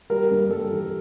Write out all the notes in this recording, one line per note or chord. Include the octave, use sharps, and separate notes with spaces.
G3 A#4
G2
G2 A4
E3
A4